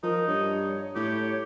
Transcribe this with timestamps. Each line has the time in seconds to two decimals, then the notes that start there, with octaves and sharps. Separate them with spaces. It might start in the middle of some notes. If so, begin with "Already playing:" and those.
0.03 F3 D#4 A#4
0.27 G2 C#5
0.95 A2 G4 C#5